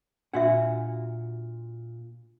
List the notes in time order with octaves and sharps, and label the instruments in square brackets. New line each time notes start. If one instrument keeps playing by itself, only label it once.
[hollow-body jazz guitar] A#2 F#5 [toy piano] D4 F#4 E5